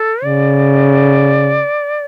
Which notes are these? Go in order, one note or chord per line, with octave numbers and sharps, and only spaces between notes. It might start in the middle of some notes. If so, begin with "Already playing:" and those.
Already playing: A4
C#3 D5